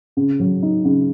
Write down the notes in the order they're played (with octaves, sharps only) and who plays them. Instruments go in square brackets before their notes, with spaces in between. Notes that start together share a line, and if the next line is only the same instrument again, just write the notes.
[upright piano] C#3
F#3
D#4
C#3